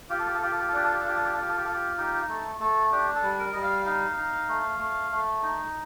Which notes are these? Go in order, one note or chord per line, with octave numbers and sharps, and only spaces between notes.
F4 G4
A4
G4
A4
F4 G4
A4
G4
A4
D4 G4
A4
G4
A4
F4 G4
A4
G4
F4 A4
G4
A4
G4
F4 A4
G4
D#4 G4
A3 A4
A3 A4
D4 G4
A4
G3
A#4
G3 D#5
F5
D#4 F5
D#4
A3
A3
A3
D#4